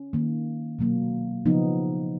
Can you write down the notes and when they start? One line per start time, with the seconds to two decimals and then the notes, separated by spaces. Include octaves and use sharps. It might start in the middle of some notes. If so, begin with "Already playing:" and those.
Already playing: C#4
0.13 D#3 A#3
0.79 B2 F#3 A#3
1.46 C#3 F3 B3 D#4